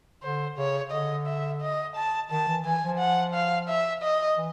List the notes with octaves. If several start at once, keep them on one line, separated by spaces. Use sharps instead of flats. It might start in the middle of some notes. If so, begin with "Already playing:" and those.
D3 C5
C#3 C#5
D3 D#5
E5
D#5
A5
D#3 A5
E3
E3 G#5
F3
F#5
F5
E5
D#5
E3